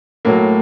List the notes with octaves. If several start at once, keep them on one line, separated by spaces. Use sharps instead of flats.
A2 F#3 A#3